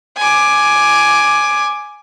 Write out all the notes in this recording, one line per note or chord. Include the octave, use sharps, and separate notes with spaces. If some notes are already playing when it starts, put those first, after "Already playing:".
G#5 D6